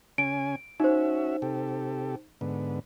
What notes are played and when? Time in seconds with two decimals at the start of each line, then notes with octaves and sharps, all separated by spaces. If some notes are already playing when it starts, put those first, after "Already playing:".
0.18 C#3 C#4 G#5 D7
0.80 C#4 D#4 F#4 C5 E5
1.42 C3 G4 A4
2.41 G#2 D3 B3